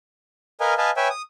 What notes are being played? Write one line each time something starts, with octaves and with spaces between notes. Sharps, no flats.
A#4 B4 D#5 F5 G#5
B4 D#5 F5 G#5 A5
B4 C#5 E5 G5 G#5
D#6